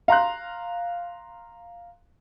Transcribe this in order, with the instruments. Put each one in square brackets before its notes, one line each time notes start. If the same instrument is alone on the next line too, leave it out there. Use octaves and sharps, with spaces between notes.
[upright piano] F5 A#5 C6 F#6